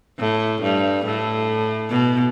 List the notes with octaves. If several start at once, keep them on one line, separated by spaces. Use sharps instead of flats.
A2
G2
A2
B2